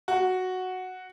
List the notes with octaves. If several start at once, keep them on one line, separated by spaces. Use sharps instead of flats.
F#4